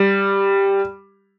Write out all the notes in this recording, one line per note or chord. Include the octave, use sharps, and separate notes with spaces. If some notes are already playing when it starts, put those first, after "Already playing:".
Already playing: G3